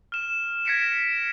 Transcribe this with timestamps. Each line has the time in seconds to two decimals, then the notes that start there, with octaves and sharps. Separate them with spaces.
0.12 F6 E7
0.65 G#6 A#6 B6 C#7 D7 E7